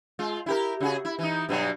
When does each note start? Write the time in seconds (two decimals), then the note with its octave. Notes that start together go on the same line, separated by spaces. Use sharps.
0.19 G#3 F4
0.46 E4 G4 A#4
0.81 C#3 F#4 G#4
1.05 E4
1.19 E3 D#4
1.49 G2 B2 F#3